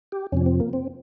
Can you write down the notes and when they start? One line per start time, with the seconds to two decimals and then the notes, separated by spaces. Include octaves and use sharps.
0.12 G4
0.32 F2 C3 F3 C#4
0.46 C4
0.60 A#3
0.73 C4